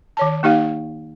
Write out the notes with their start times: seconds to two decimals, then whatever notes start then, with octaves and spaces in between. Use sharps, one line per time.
0.17 D#3 C#5 A5
0.43 A#3 D#4 G4 F5